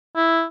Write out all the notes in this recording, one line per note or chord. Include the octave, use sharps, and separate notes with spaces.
E4